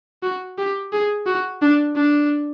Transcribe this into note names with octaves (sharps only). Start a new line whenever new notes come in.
F#4
G4
G#4
F#4
D4
D4